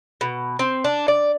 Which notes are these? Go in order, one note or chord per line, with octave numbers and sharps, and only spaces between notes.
B2
C4
D4
D5